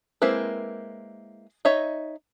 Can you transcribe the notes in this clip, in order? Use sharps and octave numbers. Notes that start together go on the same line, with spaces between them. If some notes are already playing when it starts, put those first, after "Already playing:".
G#3 A#3 C4 E4 B4
D#4 C#5 D#5 E5